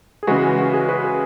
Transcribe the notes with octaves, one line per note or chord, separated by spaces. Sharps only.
G#4
C#3 E3 G#3 F#4 B4
F#4
G#4
F#4 B4
G#4